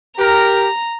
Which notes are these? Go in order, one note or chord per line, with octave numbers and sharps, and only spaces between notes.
G4 A#4 A#5